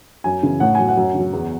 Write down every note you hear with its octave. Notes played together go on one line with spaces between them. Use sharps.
F#2 G#5
C#3 E3
A2 F#5
F#3 G#5
F#5
F#2
C#3 F#3
E2